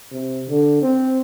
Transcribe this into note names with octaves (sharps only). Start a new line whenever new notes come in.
C3
D3
C4